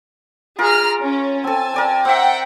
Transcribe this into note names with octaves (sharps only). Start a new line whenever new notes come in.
F4 G#4 A#4 A#5 F6
C#4
C4 A4 G#5 A5
A#4 D5 G5
C4 E5 F#5 G5